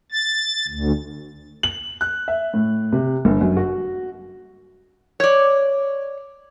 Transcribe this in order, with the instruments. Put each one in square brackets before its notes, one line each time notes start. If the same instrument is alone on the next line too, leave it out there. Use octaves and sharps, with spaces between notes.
[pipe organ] A6
D2
[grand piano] F#7
F#6
E5
A2
C3
G1
F#2
F#4
[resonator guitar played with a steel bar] C#5 D5